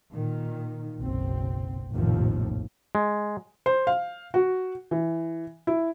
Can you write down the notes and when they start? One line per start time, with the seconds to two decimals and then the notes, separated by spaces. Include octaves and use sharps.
0.12 A#2 D#3
0.99 F#1 B1 C4
1.94 F1 A#1 D#2 A2 F3
2.95 G#3
3.66 C5
3.87 F5
4.34 F#4
4.91 E3
5.67 E4